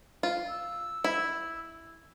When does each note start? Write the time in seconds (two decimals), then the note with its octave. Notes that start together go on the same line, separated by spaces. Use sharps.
0.23 F4
0.49 E6
1.04 E4